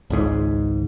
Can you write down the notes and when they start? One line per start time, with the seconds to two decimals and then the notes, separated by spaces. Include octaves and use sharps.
0.10 G#1 C#2 G#2